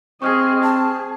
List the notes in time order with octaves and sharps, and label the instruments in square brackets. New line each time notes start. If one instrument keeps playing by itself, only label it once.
[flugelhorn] C4 [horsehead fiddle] G#4 D#5 [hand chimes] C#6 F6 G#6
[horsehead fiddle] G#4 [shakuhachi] A5